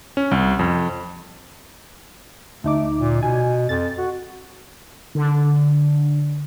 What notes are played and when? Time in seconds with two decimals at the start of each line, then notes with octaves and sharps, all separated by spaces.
0.17 C#4
0.31 C2
0.59 F2
2.64 D2 A3 D#4 D6
2.99 A#2
3.23 B2 G#5
3.69 F2 A6
3.98 F#4
5.15 D3